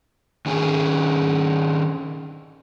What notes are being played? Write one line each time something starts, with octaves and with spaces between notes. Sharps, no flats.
D#3 C#4 G#4